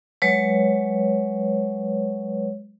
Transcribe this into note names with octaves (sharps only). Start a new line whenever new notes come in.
F#3 G#3 B4 C#5